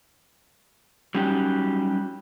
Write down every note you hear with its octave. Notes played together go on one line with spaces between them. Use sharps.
F#3 G3 C#4 D#4 F#4 G4